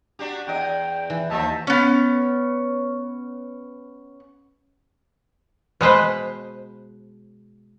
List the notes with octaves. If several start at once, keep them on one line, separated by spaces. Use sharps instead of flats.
D4 F#4 G4
E2 D#5 G5
E3
D#2 F3 G3 D#5 E5 A5
B3 C#4
B2 G#3 B4 C5